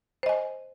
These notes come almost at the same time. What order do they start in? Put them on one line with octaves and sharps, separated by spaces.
C5 D#5 G#5